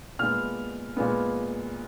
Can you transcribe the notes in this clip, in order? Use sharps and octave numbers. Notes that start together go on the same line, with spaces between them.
A#2 G#3 B3 F6
A#2 G#3 B3